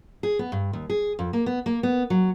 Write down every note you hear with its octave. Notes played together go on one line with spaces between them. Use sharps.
G#4
B3
G2
D#2
G#4
F2
A#3
B3
A#3
B3
F#3